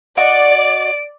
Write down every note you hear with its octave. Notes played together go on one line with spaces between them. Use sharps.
F#4 D5 D#5 D7